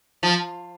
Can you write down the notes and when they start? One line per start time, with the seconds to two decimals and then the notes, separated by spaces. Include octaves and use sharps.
0.23 F3